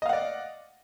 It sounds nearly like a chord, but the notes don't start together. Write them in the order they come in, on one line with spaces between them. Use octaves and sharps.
D#5 F5 F#5 D5